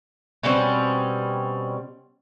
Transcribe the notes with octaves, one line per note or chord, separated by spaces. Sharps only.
B2 G3 C4 C#4